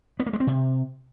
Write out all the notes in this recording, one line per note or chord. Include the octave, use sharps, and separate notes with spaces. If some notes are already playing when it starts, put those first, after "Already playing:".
B3
A#3
G#3
C4
C3